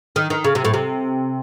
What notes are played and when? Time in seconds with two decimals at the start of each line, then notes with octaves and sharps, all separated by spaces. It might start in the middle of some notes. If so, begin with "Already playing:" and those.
0.16 D#3
0.30 D#3
0.44 C#3
0.55 C3
0.65 A2
0.74 C3